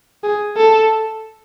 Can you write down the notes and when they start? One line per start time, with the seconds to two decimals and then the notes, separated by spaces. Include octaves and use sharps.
0.24 G#4
0.57 A4